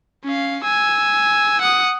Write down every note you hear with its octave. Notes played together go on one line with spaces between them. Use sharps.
C#4 F5
G#5 E6
F#5 D#6